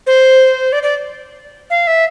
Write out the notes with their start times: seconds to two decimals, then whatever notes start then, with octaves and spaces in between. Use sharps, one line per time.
0.07 C5
0.72 D5
0.83 D5
1.70 F5
1.87 E5